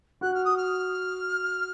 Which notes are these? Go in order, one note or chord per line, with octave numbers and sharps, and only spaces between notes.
F#4 F#6
F6
D#6
F6